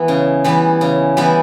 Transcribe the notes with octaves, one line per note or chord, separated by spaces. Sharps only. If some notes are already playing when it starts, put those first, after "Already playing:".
Already playing: E3 B3 E4
C#3
E3 G3 B3 E4
C#3
E3 G3 B3 E4